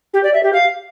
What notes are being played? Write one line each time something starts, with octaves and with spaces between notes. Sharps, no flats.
G4
D5
E5
G4
F5